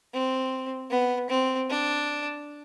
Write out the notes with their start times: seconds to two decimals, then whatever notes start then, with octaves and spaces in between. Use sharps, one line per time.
0.13 C4
0.91 B3
1.30 C4
1.70 D4